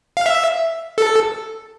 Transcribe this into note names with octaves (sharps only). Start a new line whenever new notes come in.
F5
E5
A4